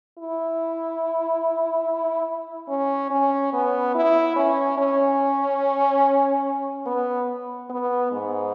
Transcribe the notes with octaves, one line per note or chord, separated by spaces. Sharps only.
E4
C#4
C#4
B3
E4
C#4
C#4
B3
B3
G#2